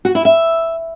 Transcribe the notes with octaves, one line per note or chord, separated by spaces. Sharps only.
F#4
E4
E5